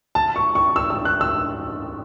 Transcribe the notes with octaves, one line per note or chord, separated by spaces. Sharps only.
A5
C#6
C#6
E6
E6
F#6
E6